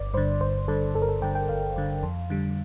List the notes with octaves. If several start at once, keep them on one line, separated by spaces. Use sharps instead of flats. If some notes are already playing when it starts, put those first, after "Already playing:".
Already playing: G1 D5
G2 D3 C5
G1 C5
G2 D3 A4
G1 A4
A#4
A4
G2 D3 G5
G5
G1 F5
G2 D3
F2
D3 G3